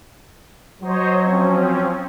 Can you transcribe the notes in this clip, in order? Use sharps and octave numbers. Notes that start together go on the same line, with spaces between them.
F#3 C5 C#5 D#5
F3 C4 C#4